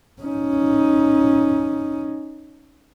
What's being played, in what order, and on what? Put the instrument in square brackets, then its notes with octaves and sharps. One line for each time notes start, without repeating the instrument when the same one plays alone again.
[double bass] C#4 D#4